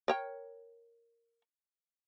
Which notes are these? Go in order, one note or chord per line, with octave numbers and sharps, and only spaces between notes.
A#4 C#5 G5